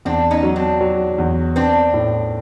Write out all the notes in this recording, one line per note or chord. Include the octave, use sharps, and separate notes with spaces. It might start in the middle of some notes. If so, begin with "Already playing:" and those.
E2 C4 D4
C#4 D#4
F#3
C4 D4
F#3
E2
B3 C4 D4
A2